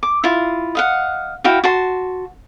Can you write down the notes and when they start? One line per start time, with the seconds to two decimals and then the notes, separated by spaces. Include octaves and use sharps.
0.03 D6
0.24 E4 F4
0.75 D#5 F5 F#5
1.44 E4 F#4 F5 G5
1.64 F#4 A5 C6